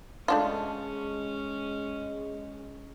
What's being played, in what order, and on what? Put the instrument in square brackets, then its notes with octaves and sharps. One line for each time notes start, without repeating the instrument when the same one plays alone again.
[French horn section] G#3 [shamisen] A3 D4 F4 [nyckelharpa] C#4